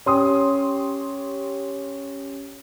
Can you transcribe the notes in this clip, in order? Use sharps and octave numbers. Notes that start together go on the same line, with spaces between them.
C#4 G4 C6 D#6